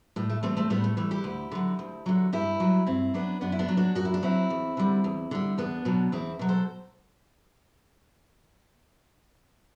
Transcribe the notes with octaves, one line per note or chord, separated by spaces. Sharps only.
A2 G3
A3
E3 G3 A3 C4
A3 C4
A2 G3 B3
A3
E3 G3 A3
E4 G4
D2
D3 F#3
D2
D3 F#3
G2 E4 G4
F#3
G2 C4 E4
F#3 B3 D4
F#2 B3 D4
E4
B3 D4
F#3
D4 F#4
F#2 F#4
E4
D4
F#3 C4 E4
E2
D3 G3
E2
D3 G3
E2 B3 D4
B2 F#3
E2 C4 E4
B2 F#3
A4 C5